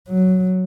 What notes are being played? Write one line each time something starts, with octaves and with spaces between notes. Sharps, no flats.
F#3